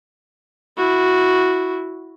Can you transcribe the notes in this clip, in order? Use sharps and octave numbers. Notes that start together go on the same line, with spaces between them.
E4 F#4